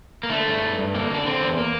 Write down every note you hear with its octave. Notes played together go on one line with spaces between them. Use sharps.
A#3
D3 A3
G2
G2
G2
D3 A#3
D3 D4
D3 C4
E2
A#3